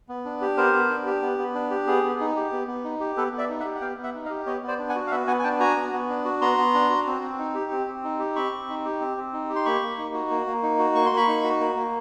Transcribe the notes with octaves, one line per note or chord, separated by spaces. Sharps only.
B3
D4
G4
B3 A#4 C5
B3
D4
G4
B3
B3
D4
G4
B3 G#4
B3
D#4
G4
B3
B3
D#4
G4
B3 A4 B4
B3
D5 E5
D#4
E5 F#5
G4
F#5
B3 F5 G5
B3
E5 F#5
D#4
D#5 F5
G4
B3 C#5 D#5
B3 C5 D5
D4
F#5 G#5
F#4
F5
B3 E5 F#5
B3 F#5 G#5
G#5
D4 G5 A5
F#4 G#5 A#5
B3
B3
D4
F#4
B3 A#5 C6
B3
D4
F#4
C4
C4
D#4
G4
C4
C4
D#4
G4
C4 B5 C#6
C4
D#4
G4
C4
C4
D#4
G4
C6
A#3 B5 C#6
A#3
D#4
F#4
A#3
A#3
D#4
F#4
A#3 C#6
C6
A#3
B5 C#6
D#4
F#4
A#3
A#3